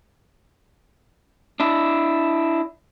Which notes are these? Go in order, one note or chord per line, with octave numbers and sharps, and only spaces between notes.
D4 E4